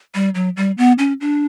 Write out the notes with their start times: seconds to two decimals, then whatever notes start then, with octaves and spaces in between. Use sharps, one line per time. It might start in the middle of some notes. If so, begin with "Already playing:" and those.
0.15 G3
0.35 F#3
0.57 G3
0.78 B3
0.98 C#4
1.21 D4